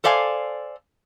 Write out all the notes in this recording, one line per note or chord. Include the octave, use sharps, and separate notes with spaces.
A4 C5 D5 F5 G#5